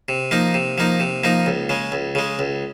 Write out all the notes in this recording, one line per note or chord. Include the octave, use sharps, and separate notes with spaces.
C3
F3 A#3 D#4
C3
F3 A#3 D#4
C3
F3 A#3 D#4
C#2
C#3 G#3
C#2
C#3 G#3
C#2